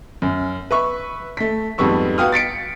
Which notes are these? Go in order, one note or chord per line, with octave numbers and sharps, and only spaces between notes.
F#2
B4 E5 C#6
A3 B6
F2 G#2 G3 B3 C#6 E6
B3 F#4 F5 G5 D#6 F6
A6 B6 C#7 D7